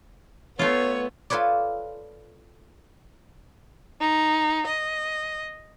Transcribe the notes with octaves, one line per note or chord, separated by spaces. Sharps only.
A3 B3 F4 C#5
F4 A4 B4 C#5 D5
D#4
D#5